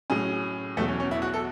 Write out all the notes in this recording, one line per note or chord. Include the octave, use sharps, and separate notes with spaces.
A2 F#3 C#4 G#4
E2 B2 F#3 A3
C#4
C#4
E4
F#4
A4